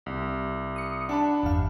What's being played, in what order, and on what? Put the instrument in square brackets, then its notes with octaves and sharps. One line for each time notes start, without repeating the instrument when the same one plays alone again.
[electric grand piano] C2
[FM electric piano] D#6 C#7
[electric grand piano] D4 A5 B5 [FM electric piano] F#5
[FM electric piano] G1 E2 F5